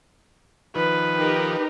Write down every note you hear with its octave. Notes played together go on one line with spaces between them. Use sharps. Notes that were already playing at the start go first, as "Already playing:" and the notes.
D#3 F3 B4
D#4 G4 A#4